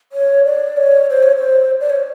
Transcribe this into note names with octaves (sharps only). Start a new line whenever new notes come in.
C#5
D5
C#5
C5
C#5
C5
D5
C#5